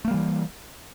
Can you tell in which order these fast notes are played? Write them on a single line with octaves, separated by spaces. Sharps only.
A3 A#3 G3 E3